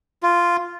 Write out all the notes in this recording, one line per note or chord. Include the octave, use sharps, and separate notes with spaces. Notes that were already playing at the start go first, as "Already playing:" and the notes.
F4